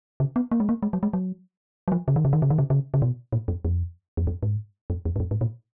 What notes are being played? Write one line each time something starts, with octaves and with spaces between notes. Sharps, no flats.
C#3
B3
A#3
G#3
A#3
G#3
F#3
G#3
F#3
F#3
F3
C#3
D#3
C#3
D#3
C#3
D#3
C#3
C#3
C#3
B2
A#2
F#2
F2
F2
F#2
G#2
F#2
F2
G#2
F#2
G#2
A#2